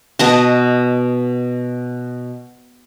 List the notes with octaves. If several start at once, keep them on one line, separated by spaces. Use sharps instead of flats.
B2 D#5 A5